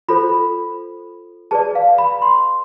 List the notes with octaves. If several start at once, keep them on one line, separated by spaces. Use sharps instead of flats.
F4 A4 C5 B5
G#4 B4 D5 A5
F5
B5
C6